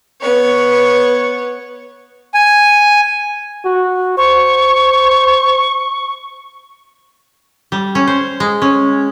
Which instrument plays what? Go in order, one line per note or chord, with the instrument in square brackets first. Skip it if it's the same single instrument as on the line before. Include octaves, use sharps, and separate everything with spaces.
[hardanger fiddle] B3 C#5
[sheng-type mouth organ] G#5
[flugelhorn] F#4
[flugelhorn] C5 [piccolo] C#6
[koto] G3
C#4
C5
G#3
C#4